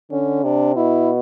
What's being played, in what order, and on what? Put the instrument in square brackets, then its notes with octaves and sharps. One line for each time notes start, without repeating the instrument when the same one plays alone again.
[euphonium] D3 [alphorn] C#4
[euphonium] C3 [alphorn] D4
[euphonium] B2 [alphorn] E4